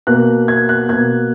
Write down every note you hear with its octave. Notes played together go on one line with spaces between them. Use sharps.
B2 A#3 F#6
G#6
F#6
B2 A#3 G#6